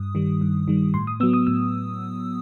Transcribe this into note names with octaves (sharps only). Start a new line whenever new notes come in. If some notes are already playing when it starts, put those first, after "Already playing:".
Already playing: G2 D#6
D#3 G3
G2
D#3 G3
A2 C6
D#6
F#3 B3 E6
D#6
A2 E6